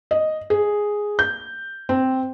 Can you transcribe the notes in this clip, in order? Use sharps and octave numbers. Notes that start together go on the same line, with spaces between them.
D#5
G#4
G6
C4